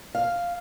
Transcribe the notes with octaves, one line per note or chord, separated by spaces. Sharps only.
F5